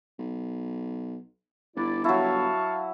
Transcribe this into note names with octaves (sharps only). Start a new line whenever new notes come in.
B1
G1 E4 D5
F#3 E4 F5 A5 C#6